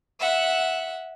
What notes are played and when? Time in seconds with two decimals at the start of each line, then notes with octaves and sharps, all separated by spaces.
0.20 E5 F#5